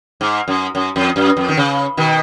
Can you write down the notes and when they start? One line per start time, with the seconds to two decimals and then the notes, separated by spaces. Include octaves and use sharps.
0.21 G#2
0.48 F#2
0.75 F#2
0.96 F2
1.16 F#2
1.37 F2
1.48 D#3
1.57 C#3
1.97 B2 D#3